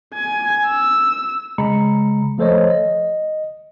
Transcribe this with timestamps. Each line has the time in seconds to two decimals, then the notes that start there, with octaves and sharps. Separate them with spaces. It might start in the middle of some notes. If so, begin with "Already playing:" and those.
0.14 G#5
0.67 E6
1.58 C#3 G#3 A#5 B5 C#7
2.38 F3 A3 A4 C5 C#5 D#5
2.70 D#5